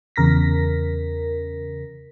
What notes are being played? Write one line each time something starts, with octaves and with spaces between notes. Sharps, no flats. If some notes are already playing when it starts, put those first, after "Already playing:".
E2 C#3 A#4 A#6 B6